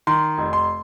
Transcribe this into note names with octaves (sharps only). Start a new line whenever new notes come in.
D#3 C6
F1
C6